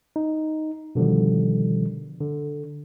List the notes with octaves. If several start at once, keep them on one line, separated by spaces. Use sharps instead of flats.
D#4
B2 D3 D#3 F3 G3
D3